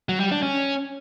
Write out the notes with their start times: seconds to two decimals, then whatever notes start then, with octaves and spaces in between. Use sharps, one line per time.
0.09 F#3
0.20 G3
0.31 D4
0.43 C#4